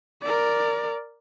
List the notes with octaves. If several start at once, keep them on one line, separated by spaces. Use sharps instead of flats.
A#4 D5